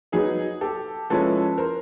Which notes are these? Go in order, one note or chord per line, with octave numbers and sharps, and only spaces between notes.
F#3 B3 D#4 G#4
G4 A4
F3 G#3 C#4 E4 A4 B4
A#4 C5